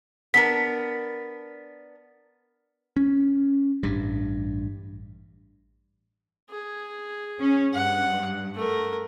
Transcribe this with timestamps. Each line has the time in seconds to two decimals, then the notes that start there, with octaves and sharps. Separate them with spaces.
0.34 B3 D4 A#4 B6
2.96 C#4
3.83 A1 G2
6.50 G#4
7.39 C#4
7.73 G2 F#5
8.54 A3 A#4